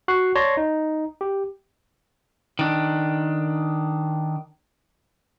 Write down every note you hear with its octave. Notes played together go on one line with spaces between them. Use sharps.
F#4 C#6 F#6 C7
C#5 D5 A5 C6 A#6 C7
D#4
G4
D#3 D4